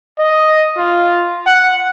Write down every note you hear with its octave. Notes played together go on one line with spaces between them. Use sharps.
D#5
F4
F#5